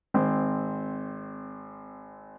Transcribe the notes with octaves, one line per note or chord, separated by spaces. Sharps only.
G#1 C4